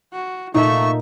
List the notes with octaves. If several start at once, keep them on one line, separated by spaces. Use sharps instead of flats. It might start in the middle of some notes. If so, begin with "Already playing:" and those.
F#4
A#2 A3 D#4 E5 C#6